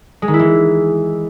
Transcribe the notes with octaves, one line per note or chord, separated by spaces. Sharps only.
G#3
D#3
E4
E3